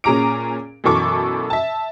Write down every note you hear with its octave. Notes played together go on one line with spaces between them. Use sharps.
A#2 C#4 G#4 A#5 D6 D7
F#2 B2 E3 A4 C#6 D6
E5 A5